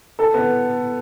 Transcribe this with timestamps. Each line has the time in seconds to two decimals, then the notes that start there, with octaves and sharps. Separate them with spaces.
0.19 A4
0.34 B3